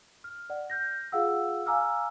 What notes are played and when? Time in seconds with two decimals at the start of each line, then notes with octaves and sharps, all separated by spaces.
0.24 F6
0.50 D5 F#5
0.70 F6 G6 A#6
1.12 F4 G#4 F5 F#5 E6
1.66 F5 G#5 A#5 D6 E6 F6